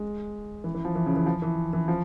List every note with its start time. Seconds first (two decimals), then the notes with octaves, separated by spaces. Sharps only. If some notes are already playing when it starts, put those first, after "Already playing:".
Already playing: G#3
0.64 E3
0.75 E3
0.85 F3
0.95 E3
1.06 C#3
1.16 E3
1.26 F3
1.42 E3
1.73 E3
1.88 F3